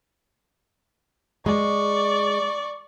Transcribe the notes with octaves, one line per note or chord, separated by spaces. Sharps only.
G#3 D5 C#6